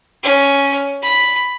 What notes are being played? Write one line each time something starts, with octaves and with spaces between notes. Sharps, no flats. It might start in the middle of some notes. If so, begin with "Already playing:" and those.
C#4
B5